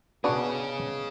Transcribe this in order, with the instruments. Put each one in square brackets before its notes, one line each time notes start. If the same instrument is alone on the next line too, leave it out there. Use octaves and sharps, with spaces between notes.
[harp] B2 F#5 [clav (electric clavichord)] B3 D4 F#4 [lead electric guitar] G#4 C#5